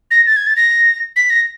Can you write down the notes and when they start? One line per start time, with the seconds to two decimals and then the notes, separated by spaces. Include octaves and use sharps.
0.11 A#6
0.27 A6
0.36 G#6
0.47 A6
0.56 A#6
1.16 B6
1.30 A#6